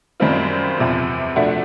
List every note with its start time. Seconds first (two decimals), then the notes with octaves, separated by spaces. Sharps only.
0.20 F#2 D#3 G3 C4 F4
0.78 E2 C3 F3
1.36 C3 F3 A3 D4 F#4